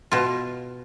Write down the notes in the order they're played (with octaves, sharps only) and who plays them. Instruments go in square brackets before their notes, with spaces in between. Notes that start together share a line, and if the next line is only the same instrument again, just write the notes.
[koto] B2 F4